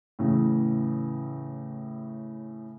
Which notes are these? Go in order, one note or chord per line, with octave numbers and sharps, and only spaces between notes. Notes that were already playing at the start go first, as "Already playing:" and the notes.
A2 C#3 E3